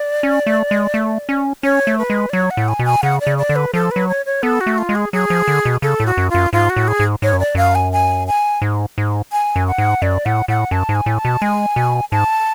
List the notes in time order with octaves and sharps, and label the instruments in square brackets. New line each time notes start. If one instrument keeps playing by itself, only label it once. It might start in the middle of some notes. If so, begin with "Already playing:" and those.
Already playing: [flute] D5
[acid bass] C#4
A3
G#3
A3
C#4
[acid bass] C#4 [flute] C#5
[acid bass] A3
[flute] B4
[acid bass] G#3
[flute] D5
[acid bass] F#3 [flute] C#5
[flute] F#5
[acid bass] A2
[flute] G#5
[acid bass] B2
[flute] G#5
[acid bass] C#3 [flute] F#5
[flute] D5
[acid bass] C#3
[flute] D5
[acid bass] D3
[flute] B4
[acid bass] F3 [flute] A4
[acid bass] F#3 [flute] B4
[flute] C#5
C#5
[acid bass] B3 [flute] A4
[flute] F#4
[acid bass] A3
[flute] F4
[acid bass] G#3
[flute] G#4
[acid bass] F#3 [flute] G#4
[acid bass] F3
D3
B2
[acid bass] C#3 [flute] A4
[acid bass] A2
[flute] F#4
[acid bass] F#2
[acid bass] F#2 [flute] F4
[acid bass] G#2 [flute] F4
[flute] F#4
[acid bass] A2
[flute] G#4
[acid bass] G#2
[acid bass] G#2 [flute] C#5
[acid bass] F#2
[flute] D5
[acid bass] F#2 [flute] F5
[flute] G#5
G#5
G#5
[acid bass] G#2
G#2
[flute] G#5
[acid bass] F#2
[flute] F#5
[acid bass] G#2
[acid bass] F#2 [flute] D5
[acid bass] A2 [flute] F#5
[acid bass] A2 [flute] F#5
[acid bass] F#2 [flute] A5
[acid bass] G#2
[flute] G#5
[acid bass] A2
[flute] A5
[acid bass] B2
[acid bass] G#3 [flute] G#5
[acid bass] B2
[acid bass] G#2 [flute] A5